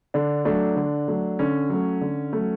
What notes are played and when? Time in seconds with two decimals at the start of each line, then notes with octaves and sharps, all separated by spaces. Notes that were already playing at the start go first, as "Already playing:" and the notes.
0.14 D3 D4
0.45 F#3 A3 D4
0.76 D3
1.08 F#3 A3
1.39 D3 C#4
1.70 F#3 A3
2.01 D3
2.33 F#3 A3